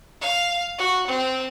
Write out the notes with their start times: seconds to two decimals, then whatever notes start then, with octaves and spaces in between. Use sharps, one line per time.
0.21 F5
0.78 F#4
1.07 C4